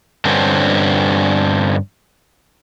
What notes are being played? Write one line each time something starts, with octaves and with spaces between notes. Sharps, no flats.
G2 D3 C4 C#4